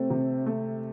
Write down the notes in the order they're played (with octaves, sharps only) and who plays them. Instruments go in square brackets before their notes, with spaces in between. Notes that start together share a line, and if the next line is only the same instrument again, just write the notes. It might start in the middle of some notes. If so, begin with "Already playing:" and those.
Already playing: [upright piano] C3 A3 [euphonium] C4
[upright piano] C3
A3